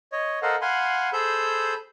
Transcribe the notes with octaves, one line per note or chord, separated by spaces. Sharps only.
C#5 D#5
A4 A#4 C5 D#5 F5 F#5
F5 F#5 G#5 B5 C6
G#4 A4 C5 B5 E6 G6